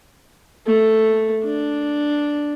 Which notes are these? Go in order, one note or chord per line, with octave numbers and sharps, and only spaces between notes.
A3
D4